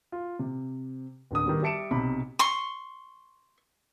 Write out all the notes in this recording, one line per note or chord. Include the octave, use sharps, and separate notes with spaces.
F4
C3
D1 D3 D#6
D#3 G3 B3
G3 E5 A5 C#7 D7 E7
B1 C3 B5
C6 C#6